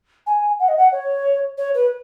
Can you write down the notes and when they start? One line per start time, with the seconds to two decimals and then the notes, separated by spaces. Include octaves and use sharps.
0.27 G#5
0.60 F#5
0.69 D#5
0.78 F#5
0.92 C#5
1.58 C#5
1.75 B4